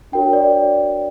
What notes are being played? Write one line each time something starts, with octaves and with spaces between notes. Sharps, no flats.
D4 F#4 A#4 C#5 G5
D5